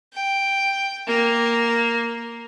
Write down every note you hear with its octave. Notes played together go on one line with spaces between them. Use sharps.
G5
A#3